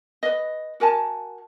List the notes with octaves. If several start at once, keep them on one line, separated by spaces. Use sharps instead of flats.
B4 D#5
F#4 A#4 G#5 A5